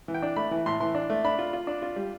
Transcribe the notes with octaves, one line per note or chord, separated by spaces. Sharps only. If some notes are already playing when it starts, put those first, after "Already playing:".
E3
G5
D4
A3 B5
E3
A2 C6
E3 C6
D4
A3
D4 B5
F4
F4
D4
F4
G3